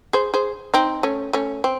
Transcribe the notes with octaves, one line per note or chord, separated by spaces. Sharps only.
G#4 C5
G#4 C5
C4 D#4
A3 C#4
A3 C#4
C4